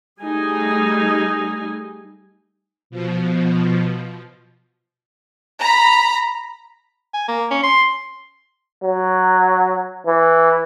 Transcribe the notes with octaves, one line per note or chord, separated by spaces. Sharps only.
G3 A3 D#4 G#4 G#5
B2 F3
A#5 B5
G#5
A#3
C#4
C6
F#3
E3